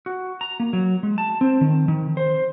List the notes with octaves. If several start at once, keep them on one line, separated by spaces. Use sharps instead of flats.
F#4
A#5
A#3
F#3
G#3
A5
C4
D#3
D#3
C5